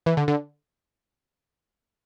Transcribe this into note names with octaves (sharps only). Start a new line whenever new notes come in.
E3
D3
D3